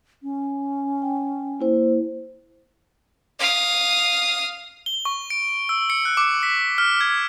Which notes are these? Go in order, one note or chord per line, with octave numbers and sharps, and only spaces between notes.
C#4
G5
A#3 E4 C5
F5 D#6
G7
C#6
D7
E6
C#7
F#6
D6
B6
F6
G#6